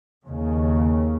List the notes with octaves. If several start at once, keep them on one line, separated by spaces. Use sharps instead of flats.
D#2 C#3